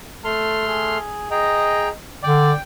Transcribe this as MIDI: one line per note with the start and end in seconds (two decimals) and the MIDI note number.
0.25 0.98 57
0.25 0.66 69
0.25 0.98 84
0.25 0.98 89
0.69 1.30 68
1.31 1.89 68
1.31 1.96 75
1.31 1.89 79
1.31 1.89 82
2.24 2.52 50
2.24 2.53 74
2.24 2.61 79